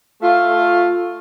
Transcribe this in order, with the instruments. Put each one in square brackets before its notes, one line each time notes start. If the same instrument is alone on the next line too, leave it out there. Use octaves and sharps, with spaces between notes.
[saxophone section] A3 F4